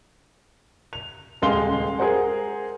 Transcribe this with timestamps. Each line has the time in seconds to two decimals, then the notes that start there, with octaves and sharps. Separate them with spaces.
0.93 F7
1.42 D#1 C#2 G#3 F5 C6 G7
1.99 G#4 A#4 C5 F#5